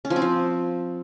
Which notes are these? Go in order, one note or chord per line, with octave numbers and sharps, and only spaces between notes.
C#4
F3
C4
F3